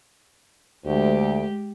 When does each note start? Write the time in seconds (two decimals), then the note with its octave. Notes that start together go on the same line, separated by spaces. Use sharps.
0.85 D2 G#3 G4